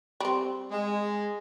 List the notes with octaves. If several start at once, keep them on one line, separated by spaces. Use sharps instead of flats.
G3 C4
G#3